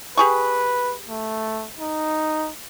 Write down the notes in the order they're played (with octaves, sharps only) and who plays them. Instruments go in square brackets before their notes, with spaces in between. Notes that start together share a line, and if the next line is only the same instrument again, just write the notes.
[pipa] G4 G#4 C#6 [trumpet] B4
[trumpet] A3
D#4